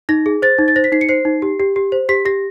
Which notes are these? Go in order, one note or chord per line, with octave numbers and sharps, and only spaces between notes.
D#4 A#6
G#4
C5 A6
D#4
A6
C5 A#6
B6
D#4 C7
C#7
C5 C7
D#4
G4
G4
G4
C5
G4 B6
G4 A#6